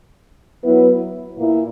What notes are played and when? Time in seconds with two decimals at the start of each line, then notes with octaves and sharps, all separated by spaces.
0.63 F#3 B3 E4 B4
1.37 A#2 A#3 E4